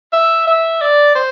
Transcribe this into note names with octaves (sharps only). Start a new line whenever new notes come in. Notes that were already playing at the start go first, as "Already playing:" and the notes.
E5
E5
D5
C5